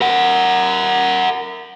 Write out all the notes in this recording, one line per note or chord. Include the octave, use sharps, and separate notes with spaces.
A#4 F#5